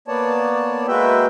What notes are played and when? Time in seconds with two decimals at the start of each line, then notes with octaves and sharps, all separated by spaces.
0.08 A#3 B3 C#5 D5 A5
0.88 G#3 A#3 F#4 B4 E5 G5